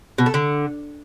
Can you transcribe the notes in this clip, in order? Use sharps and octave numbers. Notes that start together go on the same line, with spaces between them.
B2
A3
D3